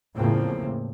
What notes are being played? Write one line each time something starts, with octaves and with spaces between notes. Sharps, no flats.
E2 A2 C#3 F3 A#3 C4